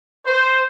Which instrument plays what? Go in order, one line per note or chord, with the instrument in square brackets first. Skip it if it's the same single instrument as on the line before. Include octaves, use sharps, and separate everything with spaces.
[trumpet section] C5